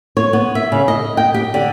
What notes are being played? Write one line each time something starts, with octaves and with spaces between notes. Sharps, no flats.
C#5
B3
E5
C#3
D#5
G5
G4
D3